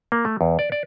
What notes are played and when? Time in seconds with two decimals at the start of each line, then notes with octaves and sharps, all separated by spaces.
0.12 A#3
0.25 A3
0.41 E2
0.59 D5
0.72 D5